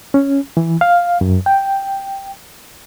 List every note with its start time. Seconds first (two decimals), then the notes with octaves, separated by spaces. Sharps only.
0.14 C#4
0.57 E3
0.81 F5
1.21 F#2
1.46 G5